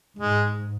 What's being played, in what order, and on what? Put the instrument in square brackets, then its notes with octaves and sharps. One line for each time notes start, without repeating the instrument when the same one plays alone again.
[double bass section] G#2 [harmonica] G#3